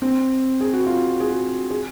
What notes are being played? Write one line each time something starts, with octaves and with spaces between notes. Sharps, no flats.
C4
G#4
F#4
F4
G#4
F#4
G#4